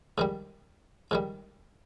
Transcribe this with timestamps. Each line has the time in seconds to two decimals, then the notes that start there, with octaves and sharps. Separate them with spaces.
0.18 G#2 D#3 G3
1.11 G#2 D#3 G3